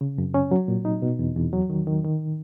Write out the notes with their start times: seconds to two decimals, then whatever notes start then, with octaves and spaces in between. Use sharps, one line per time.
0.01 C#3
0.18 F#2
0.34 C#4
0.51 F#3
0.68 A#2
0.85 D#4
1.02 B2
1.19 E2
1.36 E2
1.53 F#3
1.70 D#3
1.87 D#3
2.04 D#3